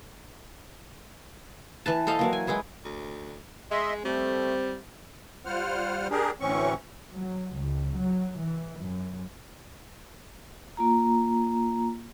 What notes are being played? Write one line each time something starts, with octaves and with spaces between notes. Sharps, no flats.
E3 B4 A5
A4 C5 D#5 F5
E3 F#3 A#3
G#5
G#3 E4 G#4 B4
D2
G#3 D#5 E5 C6
G3 A3 C4
G3 F4 C5 F#5 F6
D4 G4 G#4 A#4
D2 A2 E3 C4 C#4 C#6
F#3
C#2
F#3
E3
F#2
A#3 F4 A#5